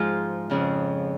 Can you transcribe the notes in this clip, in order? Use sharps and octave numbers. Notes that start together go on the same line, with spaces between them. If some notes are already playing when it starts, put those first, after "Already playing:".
Already playing: G#2 F3 F4 G#4
F2 C#3 F3